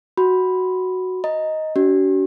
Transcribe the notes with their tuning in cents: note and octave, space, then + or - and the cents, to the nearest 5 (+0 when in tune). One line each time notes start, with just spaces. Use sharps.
F#4 +0 B5 +0
D#5 +10 A#5 +0
D4 -45 F#4 +40